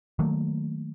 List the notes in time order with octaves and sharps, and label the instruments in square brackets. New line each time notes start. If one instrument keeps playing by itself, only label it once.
[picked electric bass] D#3 F#3 A3 A#3